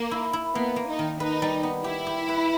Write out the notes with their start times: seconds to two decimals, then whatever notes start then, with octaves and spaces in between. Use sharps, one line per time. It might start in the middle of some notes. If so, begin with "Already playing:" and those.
Already playing: A#3
0.11 E4
0.33 E4
0.55 A#3 B3
0.76 A#3
0.88 D#4
0.99 D#3
1.20 D#4 B4
1.42 G3
1.63 B3
1.84 E4 G4
2.07 G4
2.29 B4